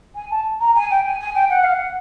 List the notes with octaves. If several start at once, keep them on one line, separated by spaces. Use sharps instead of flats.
G#5
A5
A#5
G#5
G5
G#5
G#5
G5
F#5
F5
F#5